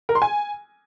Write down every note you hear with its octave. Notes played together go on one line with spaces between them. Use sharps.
A#4
C6
G#5